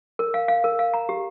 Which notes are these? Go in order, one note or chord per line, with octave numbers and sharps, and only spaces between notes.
A#4
F5
F5
A#4
F5
A#5
G4